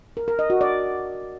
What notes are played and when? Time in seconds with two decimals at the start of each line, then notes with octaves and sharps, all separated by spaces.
0.17 A#4
0.28 A#4
0.39 D#5
0.50 F#4
0.61 D5